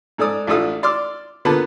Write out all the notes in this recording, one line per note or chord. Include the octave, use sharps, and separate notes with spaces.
G#2 A4 D5 D#6
A1 D4 E4 F4 A4 D#6
D5 C6 D6 E6 F6
D3 A#3 B3 F4 A5 B5